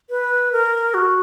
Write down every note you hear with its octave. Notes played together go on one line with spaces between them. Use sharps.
B4
A#4
F#4